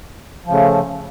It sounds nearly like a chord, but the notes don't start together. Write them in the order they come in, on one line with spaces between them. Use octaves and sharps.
F3 C#3 A3